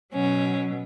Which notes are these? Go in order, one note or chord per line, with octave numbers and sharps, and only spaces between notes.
B2 F#3 C#4